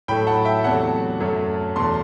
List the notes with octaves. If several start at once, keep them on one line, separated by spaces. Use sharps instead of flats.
A2 F#3 A3 G5 B5
F#5 A5
E5 G5
E2 C3 F#3 A3 F#5 A5
F#2 F#3 A3
E2 B2 A3 A5 C6